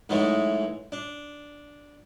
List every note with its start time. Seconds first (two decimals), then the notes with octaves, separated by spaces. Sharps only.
0.09 G#2 E3 F#3 G#3 A3
0.92 D4